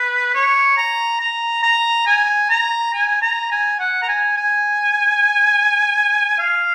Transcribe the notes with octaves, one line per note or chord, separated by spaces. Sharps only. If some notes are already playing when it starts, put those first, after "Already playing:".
Already playing: B4
C#5
A#5
A#5
A#5
G#5
A#5
G#5
A#5
G#5
F#5
A#5
G#5
G#5
F5